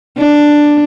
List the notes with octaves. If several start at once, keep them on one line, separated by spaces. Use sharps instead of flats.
D4